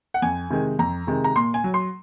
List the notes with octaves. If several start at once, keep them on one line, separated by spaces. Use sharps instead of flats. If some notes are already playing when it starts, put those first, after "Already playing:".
F#5
F2 G#5
C3 D#3 G#3
F2 A#5
C3 D#3 G#3
A#5
A#2 C6
G#5
F#3
C6